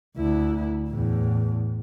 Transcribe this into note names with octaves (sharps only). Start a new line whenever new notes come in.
D2 E4
E2 A2